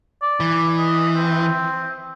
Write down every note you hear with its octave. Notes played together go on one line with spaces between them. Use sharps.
D5
E3
D#5
C4